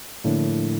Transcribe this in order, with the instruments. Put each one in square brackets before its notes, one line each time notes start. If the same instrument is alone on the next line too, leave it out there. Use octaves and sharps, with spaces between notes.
[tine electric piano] A2 [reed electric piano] D3 F3 A#3 D4